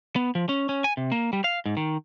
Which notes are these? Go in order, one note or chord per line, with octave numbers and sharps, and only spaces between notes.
B3
F3
C#4
C#4
G#5
C3
A#3
G3
F5
G#2
D#3